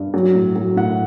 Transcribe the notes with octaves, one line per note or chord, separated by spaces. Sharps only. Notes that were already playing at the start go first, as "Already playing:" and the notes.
Already playing: G2
F#3
A2
F#3
A2 F#5